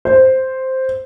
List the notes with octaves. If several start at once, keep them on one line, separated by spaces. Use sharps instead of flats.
C5